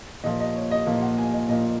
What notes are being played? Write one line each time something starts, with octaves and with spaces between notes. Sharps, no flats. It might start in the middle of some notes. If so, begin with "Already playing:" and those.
A#2 F3 A#3 D#5
D#5
C#5
D#5
A#2 F3 A#3 D#5
F#5
G#5
D#5
A#2 F3 A#3 D#5